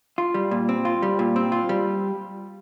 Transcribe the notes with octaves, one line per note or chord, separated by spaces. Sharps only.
F4
G3
A#2
C4
F4
G3
A#2
C4
F4
G3